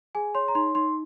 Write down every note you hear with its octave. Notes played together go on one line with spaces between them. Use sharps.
G#4 G#5
C#5 C6
A#5
D#4 C6
D#4 C6